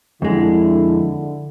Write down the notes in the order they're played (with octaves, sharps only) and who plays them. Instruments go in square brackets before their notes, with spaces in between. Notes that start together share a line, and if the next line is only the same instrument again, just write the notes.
[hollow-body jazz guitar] F2 G#3 [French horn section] D3 [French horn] E4